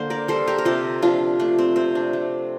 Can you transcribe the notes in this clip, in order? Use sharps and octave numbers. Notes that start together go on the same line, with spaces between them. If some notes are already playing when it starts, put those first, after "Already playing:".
Already playing: D3 A#3 C5
A#4 D5
G3 A4 C5
G4 A#4
A#4
C3 F4 A4
F3 D4 F4
A3 D4
C4
C3 C4
D4
A3